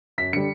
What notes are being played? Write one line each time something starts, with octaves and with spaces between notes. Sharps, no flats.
F#2 B6
D3 G3 C#7